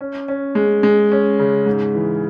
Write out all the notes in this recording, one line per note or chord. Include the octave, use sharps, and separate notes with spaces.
C#4
C#4
G#3
G#3
C#4
C#3
G#2
E3